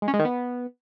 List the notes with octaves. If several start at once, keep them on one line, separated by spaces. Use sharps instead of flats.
G#3
C#4
G#3
D#3
B3